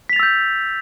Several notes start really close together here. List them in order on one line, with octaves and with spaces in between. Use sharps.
B6 F7 A6 E6 G6